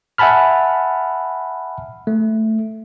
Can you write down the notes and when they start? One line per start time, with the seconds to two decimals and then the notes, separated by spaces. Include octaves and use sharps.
0.18 E5 F#5 G#5 A5 B5 F6
2.07 A3